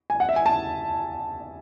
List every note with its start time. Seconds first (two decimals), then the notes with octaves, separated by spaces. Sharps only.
0.10 G#5
0.20 F#5
0.29 E5
0.36 G#5
0.46 A5